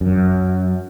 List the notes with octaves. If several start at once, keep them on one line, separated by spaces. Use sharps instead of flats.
F#2